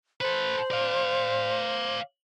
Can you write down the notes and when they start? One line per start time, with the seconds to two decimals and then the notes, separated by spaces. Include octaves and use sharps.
0.21 A4 B4 C5
0.71 D5 F5